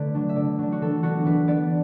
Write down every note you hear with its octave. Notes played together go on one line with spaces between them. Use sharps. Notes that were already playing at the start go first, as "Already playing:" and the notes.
Already playing: D3 A3 E4 B4 D5
F#3 D4
E5
D3 D5
F#3 D4
F#4
E3 A4
B3 D4 F#4
E3 B4
B3 D4 D5